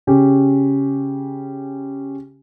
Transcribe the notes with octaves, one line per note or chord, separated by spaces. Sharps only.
C#3 C#4 G4